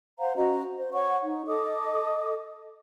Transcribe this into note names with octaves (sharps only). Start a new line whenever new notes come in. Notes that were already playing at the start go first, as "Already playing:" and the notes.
C5 F5 F#5 A#5
C#4 F#4 D#5 A#5
C5
C#5 F#5 C#6
D#4
A4 D#5 D6 D#6